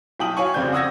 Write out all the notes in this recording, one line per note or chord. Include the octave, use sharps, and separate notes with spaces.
B1 E4 G5 A5 D#6 F#7
F#4 C#5 F5 G#5 C#6
F1 C#3 C4 D5 G6
F#5 D#6 E6 G#6 A#6